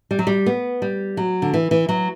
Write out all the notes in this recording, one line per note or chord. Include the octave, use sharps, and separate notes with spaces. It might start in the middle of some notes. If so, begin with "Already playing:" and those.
G3
F#3
G3
B3
G3
F#3
D3
E3
E3
F#3